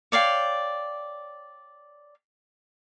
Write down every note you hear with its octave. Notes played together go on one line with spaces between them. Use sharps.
C#5 D5 F5 G5